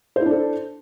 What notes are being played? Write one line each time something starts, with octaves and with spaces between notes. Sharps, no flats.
D4 E4 A4 C5